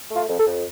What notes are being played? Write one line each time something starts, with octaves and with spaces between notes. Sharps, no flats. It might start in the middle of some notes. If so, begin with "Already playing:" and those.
A3
F4
F2
A4
F2